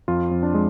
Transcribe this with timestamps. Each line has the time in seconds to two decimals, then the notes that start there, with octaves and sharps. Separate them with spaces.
0.08 F2 F4
0.31 F2
0.43 D4
0.54 G#3